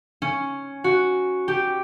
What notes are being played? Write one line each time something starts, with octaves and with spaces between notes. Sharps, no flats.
C#4
F#4
G4